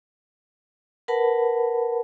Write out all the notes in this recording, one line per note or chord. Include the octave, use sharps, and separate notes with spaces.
A#4 B4 F#5 A5 B5